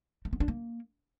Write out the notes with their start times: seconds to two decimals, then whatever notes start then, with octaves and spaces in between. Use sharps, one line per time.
0.25 A3
0.33 B3
0.40 D4
0.48 A#3